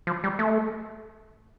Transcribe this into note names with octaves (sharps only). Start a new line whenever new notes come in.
F3
G3
A3